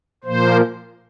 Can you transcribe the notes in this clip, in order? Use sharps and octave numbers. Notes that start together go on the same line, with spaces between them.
A#2 F3 A#3 C5